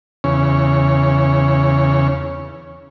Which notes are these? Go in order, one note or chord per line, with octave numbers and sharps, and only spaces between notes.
E2 C#3 C#4